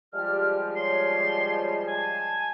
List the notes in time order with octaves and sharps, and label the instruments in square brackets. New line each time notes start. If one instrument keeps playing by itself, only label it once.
[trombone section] F3 G3 G#3 [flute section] G4 D5 F6
[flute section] C#5 [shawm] C6
[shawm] G#5 [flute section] A5